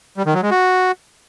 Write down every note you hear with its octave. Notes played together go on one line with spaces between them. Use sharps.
G3
D#3
F#3
G#3
F#4